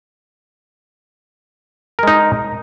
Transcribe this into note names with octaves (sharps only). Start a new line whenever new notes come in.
G#3 D#4 A#4